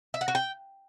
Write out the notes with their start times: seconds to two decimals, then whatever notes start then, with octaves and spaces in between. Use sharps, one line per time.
0.14 E5
0.21 F#5
0.28 F#4
0.35 G5